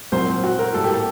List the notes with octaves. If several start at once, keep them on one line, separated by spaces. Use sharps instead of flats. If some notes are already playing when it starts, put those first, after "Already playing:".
C2 A#2 F#3 C5
F#4
A#4
A2 G3 A#3 A4
G4
A4